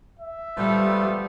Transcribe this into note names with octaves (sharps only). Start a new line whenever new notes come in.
E5
F3 G3 A3 B3